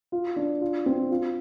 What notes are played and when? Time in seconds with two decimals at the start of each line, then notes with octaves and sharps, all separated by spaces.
0.12 F4
0.36 D4
0.61 F4
0.86 C4
1.11 F4